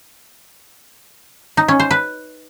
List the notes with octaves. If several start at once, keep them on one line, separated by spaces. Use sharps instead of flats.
D#4
C#4
C5
B4